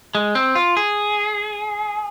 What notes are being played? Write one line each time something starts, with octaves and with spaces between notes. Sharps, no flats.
G#3
C4
F4
G#4